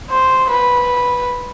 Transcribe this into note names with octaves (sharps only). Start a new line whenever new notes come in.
C5
B4